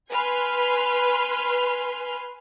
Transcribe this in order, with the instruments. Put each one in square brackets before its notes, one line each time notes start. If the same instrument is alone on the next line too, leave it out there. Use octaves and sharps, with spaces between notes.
[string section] B4 G#5 C6 F6